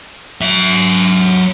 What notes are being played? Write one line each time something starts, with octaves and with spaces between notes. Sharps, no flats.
F#3 E5